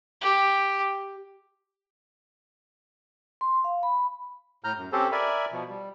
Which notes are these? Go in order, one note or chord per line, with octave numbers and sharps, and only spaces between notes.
G4
C6
F5
B5
A2 A#5 F6 G6
F#2
C4 C#4 G4 A4 C5
A#4 D5 E5 G#5 B5
B2 F3
G3